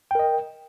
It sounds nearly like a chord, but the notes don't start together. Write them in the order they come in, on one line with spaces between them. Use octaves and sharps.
G5 A#4 D#5